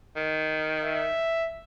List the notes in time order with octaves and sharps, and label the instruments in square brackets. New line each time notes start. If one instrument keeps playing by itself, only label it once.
[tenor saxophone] D#3
[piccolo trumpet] E5